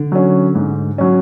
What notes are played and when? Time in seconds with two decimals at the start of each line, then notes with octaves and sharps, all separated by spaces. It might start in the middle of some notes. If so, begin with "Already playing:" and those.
Already playing: D3
0.12 F#3 C#4
0.55 G#2
0.98 F#3 C#4